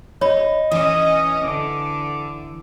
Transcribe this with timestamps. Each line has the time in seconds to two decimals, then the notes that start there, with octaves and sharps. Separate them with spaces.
0.21 D#4 C#5 B5
0.72 E3 C#4 D#5 D#6
1.44 D3 D6